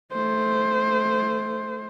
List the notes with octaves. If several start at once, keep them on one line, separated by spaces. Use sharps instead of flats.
A3 C5